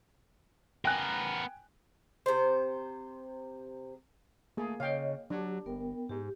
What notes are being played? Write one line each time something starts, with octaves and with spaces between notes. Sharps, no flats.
B3 A#4 G5 G#5 F#6
C3 C5
A3 A#3 G#4
C#3 C#5 D#5 F5 G5
F#3 D4 G4
G1 B3 A#4 G5
G#2 G4